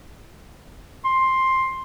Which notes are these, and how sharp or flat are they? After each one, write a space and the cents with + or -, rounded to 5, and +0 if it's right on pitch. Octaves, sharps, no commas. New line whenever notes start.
C6 +10